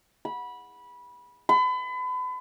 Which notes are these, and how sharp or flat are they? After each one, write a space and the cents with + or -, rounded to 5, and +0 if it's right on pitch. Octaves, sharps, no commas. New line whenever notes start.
B5 -15
B5 +35